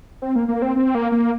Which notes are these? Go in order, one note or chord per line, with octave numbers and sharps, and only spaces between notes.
C4
A#3
A#3
C4
C4
A#3
A#3